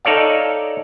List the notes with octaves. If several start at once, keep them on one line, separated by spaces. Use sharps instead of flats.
D#4 A4 C#5 D5 F5